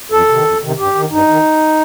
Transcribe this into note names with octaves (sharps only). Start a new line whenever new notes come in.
F2 A4
C3 D#3
F2
C3 D#3
G2 G4
D#3
G2 D#4
D#3